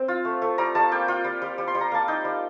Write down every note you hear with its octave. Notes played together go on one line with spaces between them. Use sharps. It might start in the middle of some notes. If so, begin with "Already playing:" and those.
Already playing: C4
F4
A3
A3
G3 A#5
G3 A5
A#3 G5
F4 G5
G3
G3
G3
C6
G3
A#5
A#3 A5
D#4 G5
G3